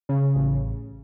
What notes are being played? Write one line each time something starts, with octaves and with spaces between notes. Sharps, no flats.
C#3
A1